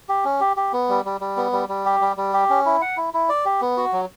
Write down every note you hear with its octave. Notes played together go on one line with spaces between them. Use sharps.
G4
C#4
G4
G4
B3
G3
G3
G3
B3
G3
G3
G4
G3
G3
G4
C#4
E4
F#5
E4
E4
D5
G4
B3
F#4
F#3